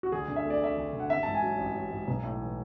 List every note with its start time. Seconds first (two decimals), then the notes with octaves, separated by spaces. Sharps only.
0.03 F#4
0.12 D2 G#4
0.28 D3
0.36 E5
0.45 A3
0.50 D5
0.62 D2 E5
0.77 D2
0.93 D3
1.00 F#5
1.10 A1 E5
1.23 G#2 A5
1.35 G#5
1.42 F#3
1.58 A1
1.75 A1
1.91 G#2
2.08 B1
2.23 A2
2.40 E3